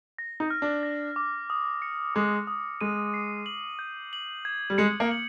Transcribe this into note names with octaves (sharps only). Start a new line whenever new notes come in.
A#6
D#4
F6
D4
A#6
D6
D#6
C#7
G#3 D#6
D#6
G#3 D#7
C7
F#7
G6
F#7
G#6
G3
G#3 C#7
A#3
F#7